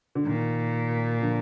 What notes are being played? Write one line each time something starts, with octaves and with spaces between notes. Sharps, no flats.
D3
A#2 D#3
D3 F3